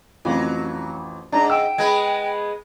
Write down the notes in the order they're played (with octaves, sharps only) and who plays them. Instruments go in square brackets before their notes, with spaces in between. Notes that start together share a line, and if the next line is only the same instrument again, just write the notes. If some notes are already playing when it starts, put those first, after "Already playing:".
[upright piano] A1 F2 [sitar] F#3
[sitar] G#2 [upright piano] D4 [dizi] A#5
[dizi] G5 [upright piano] E6
[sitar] G#3 B3 B4 [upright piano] G#6